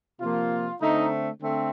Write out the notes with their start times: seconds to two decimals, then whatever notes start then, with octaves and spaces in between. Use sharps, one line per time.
0.20 C3 F3 A#3 F4
0.81 D3 A3 C4 D#4
1.41 D3 A3 C4